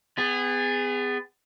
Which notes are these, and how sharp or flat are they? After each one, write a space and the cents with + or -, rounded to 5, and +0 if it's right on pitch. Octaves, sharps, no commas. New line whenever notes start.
B3 +35 G#4 -20